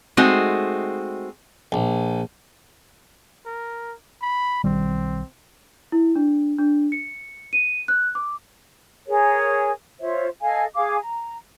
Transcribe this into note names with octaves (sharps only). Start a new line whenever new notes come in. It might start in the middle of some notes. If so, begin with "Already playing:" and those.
G#3 A3 C4 D#4 F#4
A#1
A#4
B5
B1 D#3 G3 C4
E4
D4
D4
C#7
D#7
F#6
D6
G#4 A#4 C#5
F4 C5 C#5 E5
A4 D#5 F5 G#5
G#4 F5 D6
A#5